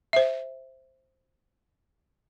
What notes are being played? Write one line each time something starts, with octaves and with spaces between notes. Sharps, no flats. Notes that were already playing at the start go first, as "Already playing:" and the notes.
C5 E5